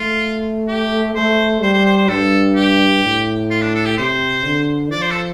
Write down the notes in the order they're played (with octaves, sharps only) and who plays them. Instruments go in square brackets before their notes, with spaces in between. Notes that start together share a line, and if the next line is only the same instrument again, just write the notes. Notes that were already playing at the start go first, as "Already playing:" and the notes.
Already playing: [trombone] A3 [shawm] F4
[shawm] G4
[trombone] A3 [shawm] C5
[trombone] G3 [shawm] C5
[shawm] C5
C5
C5
[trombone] G2 [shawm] A4
[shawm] G4
[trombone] A2
[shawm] F4
D4
A4
G4
[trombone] C3 [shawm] C5
[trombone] D3
[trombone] F3 [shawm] D5
[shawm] C5
A4